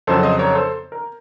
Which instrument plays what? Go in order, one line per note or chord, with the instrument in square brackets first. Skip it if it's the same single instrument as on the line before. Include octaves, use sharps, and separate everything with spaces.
[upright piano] F2 C#3 F#3 A4 C5
C5 D#5
A#4 C#5
A4 C5
A#4